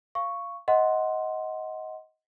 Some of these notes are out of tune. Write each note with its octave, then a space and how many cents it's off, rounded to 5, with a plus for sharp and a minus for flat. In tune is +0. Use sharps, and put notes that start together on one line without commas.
F5 -15 C#6 +0
D#5 +20 F#5 +0 C6 +0